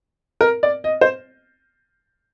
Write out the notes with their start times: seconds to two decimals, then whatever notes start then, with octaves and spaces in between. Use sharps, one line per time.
0.41 A#4
0.63 D5
0.84 D#5
1.01 C5